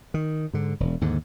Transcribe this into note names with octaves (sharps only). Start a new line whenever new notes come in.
D#3
G#2 D3
E1
D#2 G#2 D3